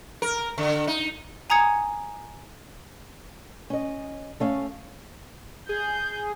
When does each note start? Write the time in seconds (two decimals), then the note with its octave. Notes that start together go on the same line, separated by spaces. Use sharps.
0.22 A#4
0.58 D3
0.87 D#4
1.50 G#5 A#5 D#6 G#6 C#7
3.70 C#4 D#5
4.40 A3 C#4 F5
5.69 G#4 G6